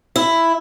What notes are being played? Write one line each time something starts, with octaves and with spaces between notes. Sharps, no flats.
E4